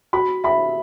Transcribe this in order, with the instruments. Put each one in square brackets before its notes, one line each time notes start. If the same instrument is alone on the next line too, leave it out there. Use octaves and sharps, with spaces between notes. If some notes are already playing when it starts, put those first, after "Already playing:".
[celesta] F#4 [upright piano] B5
[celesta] E5 [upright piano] B5